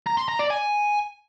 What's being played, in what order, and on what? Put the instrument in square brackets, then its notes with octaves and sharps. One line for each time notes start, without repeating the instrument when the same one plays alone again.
[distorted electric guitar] A#5
C6
A#5
D5
G#5